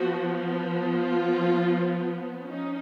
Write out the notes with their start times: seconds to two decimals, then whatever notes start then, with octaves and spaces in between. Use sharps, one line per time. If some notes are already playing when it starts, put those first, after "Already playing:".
Already playing: F3 B3 F#4
0.87 F4
2.51 C#4 D#4